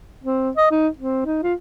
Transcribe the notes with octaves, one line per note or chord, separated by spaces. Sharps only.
C4
D#5
D#4
C4
D#4
F4